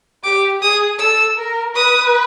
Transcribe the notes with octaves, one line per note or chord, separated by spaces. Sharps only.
G4 D6
G#4 D#6
A4 E6
A#4
B4 D#6